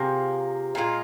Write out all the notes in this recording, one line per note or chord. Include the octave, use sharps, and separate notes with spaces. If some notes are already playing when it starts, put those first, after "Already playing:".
Already playing: C3 F3 A#3 G#4
A#2 G#3 F4